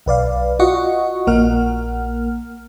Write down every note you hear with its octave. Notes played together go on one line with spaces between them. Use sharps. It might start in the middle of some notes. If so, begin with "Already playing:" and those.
B1 B4 D5 F5
F4 F#4 D#5 F#5 C#6
A#1 A#3 A#4 F#5 F6